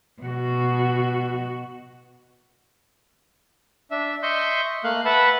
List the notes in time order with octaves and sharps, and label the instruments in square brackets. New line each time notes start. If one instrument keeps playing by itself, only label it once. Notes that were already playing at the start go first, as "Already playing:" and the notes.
[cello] B2 F#4
[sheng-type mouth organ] D4 E5
D#5 E5 C6 C#6 G6
A3 A#3 F5 F#6
B4 E5 F#5 A5 B5